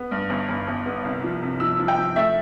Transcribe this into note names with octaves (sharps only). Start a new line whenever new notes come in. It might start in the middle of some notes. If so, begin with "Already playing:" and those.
Already playing: B3
G2
G1
G1
G1
B3
C2
F3
C3
F3 E6
F3
G5
F3
A3 E5